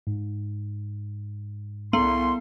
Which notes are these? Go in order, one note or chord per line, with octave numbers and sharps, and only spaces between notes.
G#2
C2 B3 C6